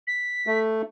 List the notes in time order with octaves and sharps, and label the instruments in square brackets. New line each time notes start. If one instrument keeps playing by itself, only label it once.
[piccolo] B6
[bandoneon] A3